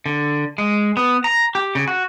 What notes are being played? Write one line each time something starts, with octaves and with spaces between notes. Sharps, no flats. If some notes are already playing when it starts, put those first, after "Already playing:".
D3
G#3
B3
A#5
G4
C#3
F#4